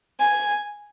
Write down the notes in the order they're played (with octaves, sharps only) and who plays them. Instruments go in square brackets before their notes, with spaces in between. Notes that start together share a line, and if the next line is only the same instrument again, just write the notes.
[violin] G#5